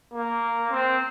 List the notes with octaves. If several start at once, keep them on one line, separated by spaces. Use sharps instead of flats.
A#3
C4